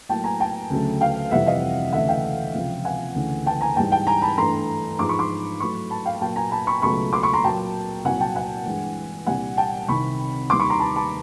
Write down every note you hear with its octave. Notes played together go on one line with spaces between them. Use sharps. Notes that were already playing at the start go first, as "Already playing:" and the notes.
A2 F#3 A#3 G5 A5
G#5 A#5
G5 A5
D2 C#3 F#3 A3
F5 G5
F2 C3 E3 G3 E5 F#5
D#5 F5
D2 C#3 E3 A3 E5 F#5
F5 G5
C#2 C3 F3 G#3
F#5 G#5
D2 C#3 E3 A3
G5 A5
G#5 A#5
G#2 E3 G3 G5 A5
G5 A5
G#5 A#5
A5 B5
G2 E3 A3 A#5 C6
G#2 F3 G#3 C6 D6
B5 C#6
C6 D6
A2 F#3 A3 B5 C#6
A5 B5
F5 G5
A#2 F#3 A#3 G5 A5
G#5 A#5
A5 B5
B5 C#6
C#2 B2 F#3 A3 B5 C#6
C6 D6
B5 C#6
A#5 C6
A#2 F#3 A#3 G5 A5
C2 A#2 F#3 F#5 G#5
G5 A5
F#5 G#5
G2 E3 G#3
C2 A#2 G3 F#5 G#5
G5 A5
C2 C3 D#3 B5 C#6
D#2 D#3 G3 C6 D6
B5 C#6
A#5 C6
A5 B5
A5 B5